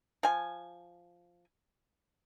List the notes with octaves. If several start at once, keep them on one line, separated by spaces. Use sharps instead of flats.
F3 G#5